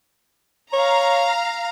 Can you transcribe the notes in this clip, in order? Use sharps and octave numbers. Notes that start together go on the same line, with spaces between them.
C#5 F5 A#5